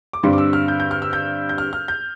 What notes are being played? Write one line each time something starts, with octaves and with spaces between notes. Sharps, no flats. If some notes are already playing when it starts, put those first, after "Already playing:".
D6
G2 D3 G3 C4 C6
D6
E6
F6
G6
G6
F6
E6
G6
G6
F6
F6
G6